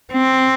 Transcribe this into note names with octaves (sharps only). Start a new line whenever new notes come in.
C4